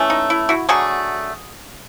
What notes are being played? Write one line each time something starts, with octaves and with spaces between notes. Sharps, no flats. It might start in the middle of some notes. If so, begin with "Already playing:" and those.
Already playing: E3 A3 C#4
D#4
E4
E4 F#4
D3 F#3 A3 F#4 G#4